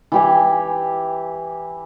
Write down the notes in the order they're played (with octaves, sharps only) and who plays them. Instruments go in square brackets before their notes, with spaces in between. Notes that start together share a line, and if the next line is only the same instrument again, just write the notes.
[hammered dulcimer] E3 G4 G#5